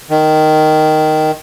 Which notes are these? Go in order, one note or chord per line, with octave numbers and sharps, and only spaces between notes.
D#3